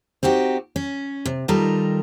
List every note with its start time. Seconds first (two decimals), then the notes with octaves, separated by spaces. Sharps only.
0.23 C4 D#4 F#4 G4
0.76 C#4
1.25 C3
1.48 D#3 G3 D#4 F4 A4 A#4